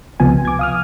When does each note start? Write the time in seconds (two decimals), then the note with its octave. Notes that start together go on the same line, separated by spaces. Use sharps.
0.20 C#2 C3 F3 B3 G#5
0.45 D6 G#6
0.59 F5 D#6 F6